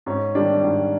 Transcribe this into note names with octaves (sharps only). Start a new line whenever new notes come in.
G#2 C#4
D#3 G3 D4
G#2